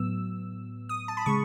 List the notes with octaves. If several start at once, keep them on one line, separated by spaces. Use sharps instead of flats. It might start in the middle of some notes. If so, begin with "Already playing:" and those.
Already playing: A2 F#3 B3 E6
D#6
A5
B5
C#3 G#3 C#6